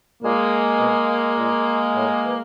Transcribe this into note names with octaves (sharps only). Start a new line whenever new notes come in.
A#2 G#3 A#3
B2
A#2
A2
E3